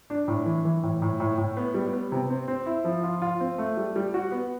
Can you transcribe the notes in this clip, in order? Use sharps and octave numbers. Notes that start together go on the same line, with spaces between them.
D4
A2
E3
E3
A2
A2
A2
A2
B3
G3
B3
C3
C4
C4
E4
F3
F4
F4
C4
A3
G3
G3
F#4
B3